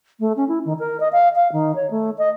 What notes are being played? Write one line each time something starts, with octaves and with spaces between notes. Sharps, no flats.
A3
C#4
E4
D#3
A#4
D#5
F5
F5
D#3
C#5
A3
D#5